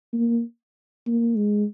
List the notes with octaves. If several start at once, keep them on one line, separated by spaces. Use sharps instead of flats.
A#3
A#3
G#3